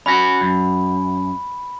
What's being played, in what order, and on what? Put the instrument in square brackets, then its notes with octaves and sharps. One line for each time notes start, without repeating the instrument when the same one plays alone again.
[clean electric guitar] C#4 F#4 [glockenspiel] B5
[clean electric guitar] F#2